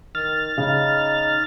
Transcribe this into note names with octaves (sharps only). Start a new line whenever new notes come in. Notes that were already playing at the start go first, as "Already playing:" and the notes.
D#3 F6 A6
C#3 D#4